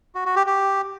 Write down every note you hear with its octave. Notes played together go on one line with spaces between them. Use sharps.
F#4
F#4
G4
G4